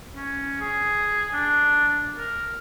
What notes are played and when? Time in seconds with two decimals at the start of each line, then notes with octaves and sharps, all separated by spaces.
0.14 C#4
0.60 G#4
1.34 D4
2.18 A#4